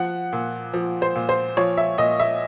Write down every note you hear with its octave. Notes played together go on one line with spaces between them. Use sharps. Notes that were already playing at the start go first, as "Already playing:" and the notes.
Already playing: F3 F#5
A#2
F3
C5
A#2
C5
F3 C#5
E5
A#2 D#5
E5